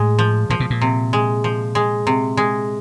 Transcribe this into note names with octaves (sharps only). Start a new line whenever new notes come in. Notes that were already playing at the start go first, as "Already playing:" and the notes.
Already playing: A2 G#3
F3
A#2 F3
B2
A#2
C3
G#3
F3
G#3
C3
G#3